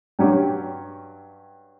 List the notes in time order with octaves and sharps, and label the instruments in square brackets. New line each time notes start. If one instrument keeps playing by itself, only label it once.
[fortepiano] G2 F#3 C#4 G4